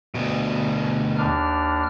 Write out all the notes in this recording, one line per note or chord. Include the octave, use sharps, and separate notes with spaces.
D2 B2
D#2 D4 F6